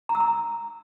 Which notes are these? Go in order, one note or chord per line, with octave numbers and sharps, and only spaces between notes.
A#5
E6
A#5